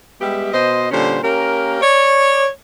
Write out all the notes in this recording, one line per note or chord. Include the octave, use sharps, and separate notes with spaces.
G3 G#3 B3 G4 E5
B2 C5 D#5
A#2 D3 G3 C#4 A4 C5
A#3 C#4 G4 A#4
C#5 D5